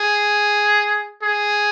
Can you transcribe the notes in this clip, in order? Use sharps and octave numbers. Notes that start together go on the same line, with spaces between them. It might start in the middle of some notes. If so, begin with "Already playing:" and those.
Already playing: G#4
G#4